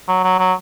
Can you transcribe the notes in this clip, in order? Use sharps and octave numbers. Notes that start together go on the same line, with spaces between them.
F#3
F#3
F#3